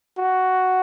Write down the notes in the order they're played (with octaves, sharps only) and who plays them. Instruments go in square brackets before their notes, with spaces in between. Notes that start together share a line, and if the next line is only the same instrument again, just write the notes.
[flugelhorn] F#4